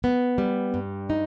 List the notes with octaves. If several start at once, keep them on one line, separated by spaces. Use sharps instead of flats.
B3
G3
G2
D#4